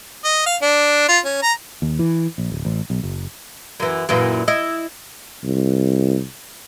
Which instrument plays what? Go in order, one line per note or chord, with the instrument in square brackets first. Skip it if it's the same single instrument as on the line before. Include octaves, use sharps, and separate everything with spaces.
[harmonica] D#5
F5
D4
F4
C#4
A#5
[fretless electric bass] D#2
E3
A#1
D1
A1
B1
F#1
[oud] F#2 E3
F#2 A#2 E3
E4 D#5
[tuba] C2